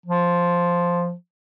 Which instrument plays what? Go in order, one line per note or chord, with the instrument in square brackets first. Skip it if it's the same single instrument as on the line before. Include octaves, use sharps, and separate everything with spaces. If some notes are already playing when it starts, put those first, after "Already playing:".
[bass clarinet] F3